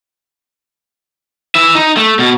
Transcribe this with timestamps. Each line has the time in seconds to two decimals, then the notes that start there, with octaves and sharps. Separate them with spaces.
1.55 E3 E5
1.75 D#4
1.97 A3
2.19 B2